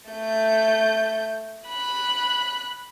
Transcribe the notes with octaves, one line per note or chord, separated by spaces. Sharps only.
A3 G6
B5 F#6